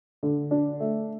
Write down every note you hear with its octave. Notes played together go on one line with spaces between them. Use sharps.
D3
D4
A3